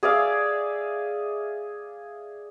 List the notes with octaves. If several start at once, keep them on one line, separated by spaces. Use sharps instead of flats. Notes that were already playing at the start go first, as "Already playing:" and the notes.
G#4 D5 E5 F5